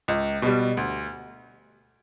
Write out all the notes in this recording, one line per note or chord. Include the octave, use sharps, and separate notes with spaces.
C#2
B2 G3
D2